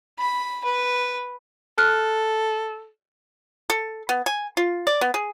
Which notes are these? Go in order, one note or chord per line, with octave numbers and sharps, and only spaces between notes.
B5
B4
A4 F6 F#6
A4
B3
G#5
F4
D5
B3
G#4